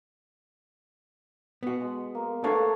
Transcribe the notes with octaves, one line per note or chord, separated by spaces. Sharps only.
B3 F#4
G#3
A#3
A3 D4 A4 B4 C#5 F5